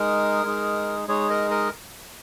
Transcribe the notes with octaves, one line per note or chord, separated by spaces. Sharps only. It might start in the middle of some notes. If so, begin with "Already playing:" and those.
Already playing: G#3 D#4 G#4 A#4
G#3 D#4 G#4
G#3 D#4 G#4 C#5
A#4 D#5
A#4 D#5